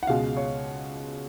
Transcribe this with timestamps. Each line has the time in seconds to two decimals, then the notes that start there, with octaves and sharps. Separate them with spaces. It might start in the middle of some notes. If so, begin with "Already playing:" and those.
0.03 F#5
0.07 C#2 B2 G#3 F5
0.37 C#5